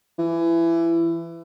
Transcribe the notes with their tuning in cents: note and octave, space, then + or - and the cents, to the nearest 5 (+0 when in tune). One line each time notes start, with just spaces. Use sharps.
E3 +20